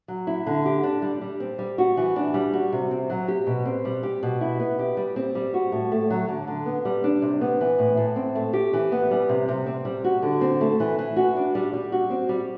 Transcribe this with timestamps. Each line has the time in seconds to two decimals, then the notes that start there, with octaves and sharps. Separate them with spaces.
0.08 F#3
0.27 E4
0.46 D3
0.66 G4
0.83 D4
1.02 G3
1.21 G3
1.40 C4
1.59 G3
1.78 F#4
1.97 E3
2.16 D4
2.34 G3
2.53 F#4
2.72 C3
2.91 C4
3.10 F#3
3.28 G4
3.47 B2
3.65 C4
3.85 G3
4.03 G4
4.23 B2
4.41 E4
4.59 B3
4.79 G4
4.97 G3
5.16 C4
5.35 G3
5.54 F#4
5.72 A2
5.92 A3
6.10 F#3
6.29 D3
6.47 D3
6.66 B3
6.85 G3
7.04 D4
7.22 C3
7.41 B3
7.61 E3
7.79 A2
7.97 A2
8.16 C4
8.35 A3
8.53 G4
8.73 E3
8.92 B3
9.11 G3
9.29 C3
9.49 C3
9.66 C4
9.85 G3
10.04 F#4
10.22 D3
10.41 C4
10.61 A3
10.80 E3
10.99 E3
11.16 F#4
11.36 D4
11.55 G3
11.74 G3
11.92 F#4
12.10 C4
12.29 G3